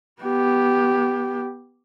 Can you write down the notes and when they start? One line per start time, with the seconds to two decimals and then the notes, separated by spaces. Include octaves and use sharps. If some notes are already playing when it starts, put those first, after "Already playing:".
0.22 B3 G4